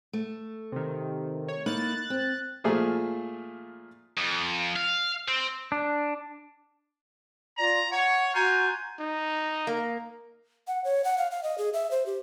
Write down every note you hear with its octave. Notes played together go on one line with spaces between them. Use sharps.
A3
C3 D#3
C#5
A#3 D#4 E4 F#6 A6
C4
A#2 F3 A3 G#4
F2
F5
C4
D4
F4 D5 A#5
C#5 F#5
F4 F#4 G#5 A#5 G6
D#4
A#3
F#5
C#5
F#5
F5
F5
D#5
G#4
E5
C5
G4